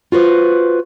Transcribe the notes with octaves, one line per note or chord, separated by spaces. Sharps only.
F4 F#4 B4 C5